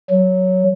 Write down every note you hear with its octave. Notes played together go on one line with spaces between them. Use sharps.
F#3